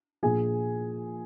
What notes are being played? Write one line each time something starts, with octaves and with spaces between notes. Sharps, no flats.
A#1 A#2 F3 G#4 G#5